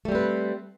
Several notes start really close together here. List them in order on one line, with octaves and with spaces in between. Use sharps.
A3 G3 C4 B4